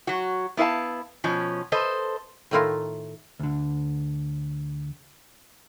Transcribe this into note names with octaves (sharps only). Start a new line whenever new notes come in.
F#3 F#4
B3 E4 C5 F5 A5
B2 F3 C#4
A4 B4 C5 D#5
A2 D#3 A3 E4 F4 A#4
D2 D3